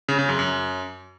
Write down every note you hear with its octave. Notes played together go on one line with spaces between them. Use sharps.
C#3
C#3
F#2
F#2